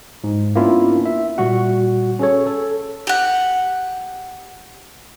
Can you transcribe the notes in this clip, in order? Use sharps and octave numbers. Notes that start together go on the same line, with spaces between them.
G#2
A#3 B3 C#4 D4 E4 F4
E5
A#2 G3 F#4 F#5
C#4 G#4 A4 C#5
A4
G4 F#5